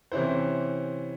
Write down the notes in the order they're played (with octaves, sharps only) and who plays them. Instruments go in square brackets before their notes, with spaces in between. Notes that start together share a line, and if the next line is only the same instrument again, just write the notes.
[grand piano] C3 E3 C#4 E4 C5